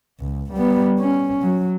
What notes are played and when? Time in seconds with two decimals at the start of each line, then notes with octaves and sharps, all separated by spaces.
0.20 C#2
0.53 G3 B3
0.99 C#4
1.42 F#3